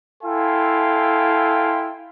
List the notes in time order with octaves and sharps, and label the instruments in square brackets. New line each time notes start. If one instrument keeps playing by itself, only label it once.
[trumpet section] E4 A4 F5 G5 G#5 C6